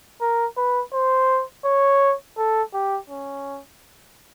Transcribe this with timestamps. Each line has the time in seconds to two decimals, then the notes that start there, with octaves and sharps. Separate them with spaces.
0.21 A#4
0.57 B4
0.93 C5
1.65 C#5
2.37 A4
2.74 G4
3.10 C#4